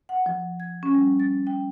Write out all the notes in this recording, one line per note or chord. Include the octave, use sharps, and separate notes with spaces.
F#5
F3
G#6
C#4
G3
A6
G5